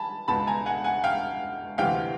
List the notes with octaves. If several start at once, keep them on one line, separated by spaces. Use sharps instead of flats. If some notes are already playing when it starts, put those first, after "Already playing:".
Already playing: G#5 A5 B5
C#2 B2 A5 B5
G#5 A#5
F#5 G#5
F#5 G#5
F5 G5
D2 C3 E3 F5 G5